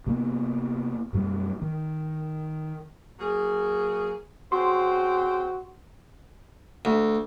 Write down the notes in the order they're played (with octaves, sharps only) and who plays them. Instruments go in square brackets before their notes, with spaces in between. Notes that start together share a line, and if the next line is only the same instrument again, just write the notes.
[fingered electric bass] C3 A#3 B3
F#2 B2 G3
D#3
[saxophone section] F#3 A#3 G#4
[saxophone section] C#3 C4 C5 [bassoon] F#4 [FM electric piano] C6
[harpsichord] D2